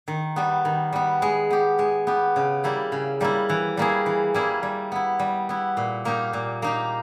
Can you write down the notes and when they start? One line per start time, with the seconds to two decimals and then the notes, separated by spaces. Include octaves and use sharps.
0.08 D#3
0.36 G3 B3
0.65 D#3
0.93 G3 B3
1.22 G#3
1.50 B3 G4
1.79 G#3
2.07 B3 G4
2.36 C#3
2.64 G3 A#3 E4
2.92 C#3
3.21 G3 A#3 E4
3.49 E3
3.77 G3 A#3 E4 G#4
4.06 E3
4.34 G3 A#3 E4 G#4
4.63 G3
4.92 B3 E4
5.19 G3
5.49 B3 E4
5.77 A#2
6.05 A#3 D#4 G4
6.33 A#2
6.62 A#3 D#4 G4